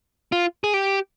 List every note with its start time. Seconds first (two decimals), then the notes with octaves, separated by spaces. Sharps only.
0.32 F4
0.64 G#4
0.74 G4